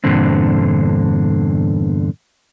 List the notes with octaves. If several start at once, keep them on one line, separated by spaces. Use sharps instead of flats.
E2 G2 A#2 D3 C4